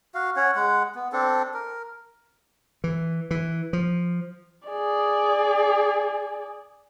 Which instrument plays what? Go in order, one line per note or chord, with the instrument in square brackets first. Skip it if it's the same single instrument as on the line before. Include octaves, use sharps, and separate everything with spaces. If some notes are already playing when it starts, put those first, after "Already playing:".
[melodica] F#4 F5
C#4 C#5 F#5
G#3 F#5
B3
C4 D4 A4
A#4
[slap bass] E3
E3
F3
[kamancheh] G#4 D5